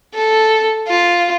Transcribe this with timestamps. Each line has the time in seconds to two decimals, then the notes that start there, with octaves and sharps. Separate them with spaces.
0.15 A4
0.88 F4